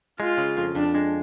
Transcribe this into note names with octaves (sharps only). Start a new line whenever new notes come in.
G#3 F4
C#3
F2
F2 D4
G#3